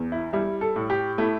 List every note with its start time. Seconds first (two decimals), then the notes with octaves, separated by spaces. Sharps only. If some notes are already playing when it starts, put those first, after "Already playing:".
Already playing: E2
0.12 E4
0.33 G3 E4
0.61 A4
0.76 A2
0.90 G4
1.18 A3 E4